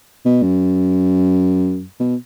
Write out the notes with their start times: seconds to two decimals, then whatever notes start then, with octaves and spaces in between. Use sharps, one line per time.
0.25 B2
0.42 F#2
2.00 B2